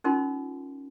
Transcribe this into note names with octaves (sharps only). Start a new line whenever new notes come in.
C#4 D#4 F4 A#4 C6